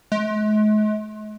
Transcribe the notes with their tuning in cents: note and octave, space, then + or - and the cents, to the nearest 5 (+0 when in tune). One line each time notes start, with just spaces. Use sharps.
G#3 +45